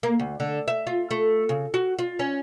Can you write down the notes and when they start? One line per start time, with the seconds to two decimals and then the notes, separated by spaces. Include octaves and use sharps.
0.03 A#3
0.19 D2
0.40 D3
0.68 E5
0.87 F4
1.11 A3
1.49 C#3
1.74 F#4
1.99 F4
2.19 C#4